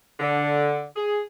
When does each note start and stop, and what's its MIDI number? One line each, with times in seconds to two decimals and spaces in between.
0.20 0.84 50
0.96 1.22 68